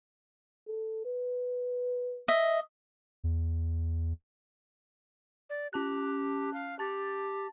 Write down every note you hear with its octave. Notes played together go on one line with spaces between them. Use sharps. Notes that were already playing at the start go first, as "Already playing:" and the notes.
A4
B4
D#5 E5
E2
D5
C#4 G4 A5 F#6
F5
G4 A5 A6